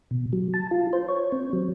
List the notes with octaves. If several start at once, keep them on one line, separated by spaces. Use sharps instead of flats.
B2
F#3
A5
F4
C5
C#5
C4
F#3